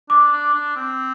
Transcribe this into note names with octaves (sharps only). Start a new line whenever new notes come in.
D4 D6
D4
D4
C4